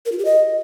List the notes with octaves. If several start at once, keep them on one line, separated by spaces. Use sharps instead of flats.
A#4
F4
G4
D#5